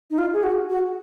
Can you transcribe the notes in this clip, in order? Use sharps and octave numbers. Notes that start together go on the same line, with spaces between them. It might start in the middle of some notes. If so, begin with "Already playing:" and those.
D#4
F4
G#4
F#4
F#4